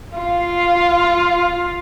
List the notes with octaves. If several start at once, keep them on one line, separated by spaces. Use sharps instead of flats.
F4 F5